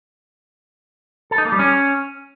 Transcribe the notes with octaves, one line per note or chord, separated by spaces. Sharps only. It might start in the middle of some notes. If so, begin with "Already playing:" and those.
A4
D#4
A#3
G3
C#4